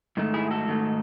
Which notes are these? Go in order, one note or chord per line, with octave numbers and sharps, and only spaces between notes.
G#2 D#3 A3
E4 G#4
F#4 A4
G#2 D#3 A3